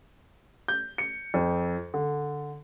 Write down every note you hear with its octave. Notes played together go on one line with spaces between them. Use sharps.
G6
C#7
F2
D3